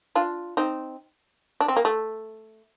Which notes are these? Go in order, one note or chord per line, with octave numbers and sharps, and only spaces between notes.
D4 F4
C4 D#4
D4
C4
A#3
A3